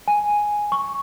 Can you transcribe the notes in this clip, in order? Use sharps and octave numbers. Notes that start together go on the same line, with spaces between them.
G#5
C#6